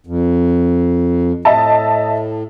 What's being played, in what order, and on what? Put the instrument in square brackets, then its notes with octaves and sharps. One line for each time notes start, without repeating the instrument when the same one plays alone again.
[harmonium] F2
[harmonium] A2 [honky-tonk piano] D#5 E5 A5